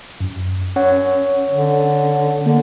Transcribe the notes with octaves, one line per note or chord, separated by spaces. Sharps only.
F#2
C#4 C#5 F#5
D3
D3 A#3